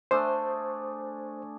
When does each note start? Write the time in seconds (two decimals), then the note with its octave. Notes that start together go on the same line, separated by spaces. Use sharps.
0.11 A3 D4 G#4 C5